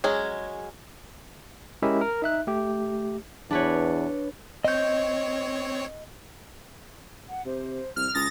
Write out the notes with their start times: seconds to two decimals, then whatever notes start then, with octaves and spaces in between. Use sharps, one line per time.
0.04 F#3 G#3 C#4 G#4
1.82 G#3 C#4 E4 G4 A#4 E5
2.01 A#4
2.22 D#4 E5 F#6
2.47 A3 G4
3.51 E2 D4 B4 C#5
4.65 C4 C#5 D#5 G6
7.28 F#5
7.45 C3 C5
7.96 C2 F6
8.14 C#2 D#6 A6 A#6